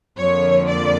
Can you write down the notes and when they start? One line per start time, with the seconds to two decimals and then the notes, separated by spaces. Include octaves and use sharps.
0.18 F2 D3 F3 A#3 C#5
0.68 D5